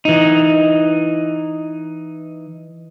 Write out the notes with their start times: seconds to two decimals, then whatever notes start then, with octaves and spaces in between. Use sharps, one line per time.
0.05 E3 D#4